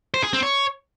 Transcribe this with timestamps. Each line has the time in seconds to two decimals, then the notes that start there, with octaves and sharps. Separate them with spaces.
0.14 C5
0.24 G#4
0.33 C4
0.43 C#5